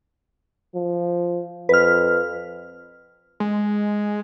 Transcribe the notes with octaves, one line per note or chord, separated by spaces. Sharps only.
F3
F2 B4 F6
G#3